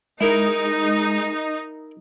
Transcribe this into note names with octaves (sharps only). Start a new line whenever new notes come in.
G#3 D#4 E4 A#4